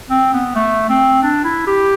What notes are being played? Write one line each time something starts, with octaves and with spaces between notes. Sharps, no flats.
C4
B3
A3
C4
D4
E4
G4